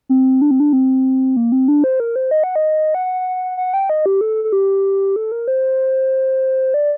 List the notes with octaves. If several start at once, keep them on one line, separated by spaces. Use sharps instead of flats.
C4
D4
C4
D4
C4
A#3
C4
D4
C5
A#4
C5
D#5
F#5
D#5
F#5
F#5
G5
D#5
G4
A4
A4
G4
A4
A#4
C5
D5